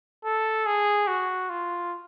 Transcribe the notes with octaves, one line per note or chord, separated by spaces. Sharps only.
A4
G#4
F#4
F4